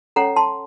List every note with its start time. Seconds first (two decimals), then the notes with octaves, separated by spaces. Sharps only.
0.16 C#4 A4 C#5 F#5 A#5
0.36 A5 C6